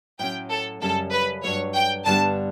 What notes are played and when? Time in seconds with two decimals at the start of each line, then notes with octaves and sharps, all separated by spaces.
0.19 A2 F#3 C#4 G5
0.50 A4
0.82 F#2 C#3 G3 C#4 A4
1.12 B4
1.43 G2 F#3 A3 C#5
1.75 G5
2.06 G2 D3 G3 B3 A5